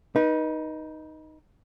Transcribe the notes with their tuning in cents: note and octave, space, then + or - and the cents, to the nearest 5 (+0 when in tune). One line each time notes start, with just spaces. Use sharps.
D#4 +0 B4 -35